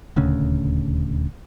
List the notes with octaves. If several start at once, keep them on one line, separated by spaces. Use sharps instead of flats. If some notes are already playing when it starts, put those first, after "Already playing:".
D#1 D2 C#3